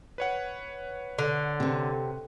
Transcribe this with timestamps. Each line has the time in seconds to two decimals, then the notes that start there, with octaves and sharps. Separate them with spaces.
0.18 B4 C#5 F#5
1.19 D3
1.60 C3 C4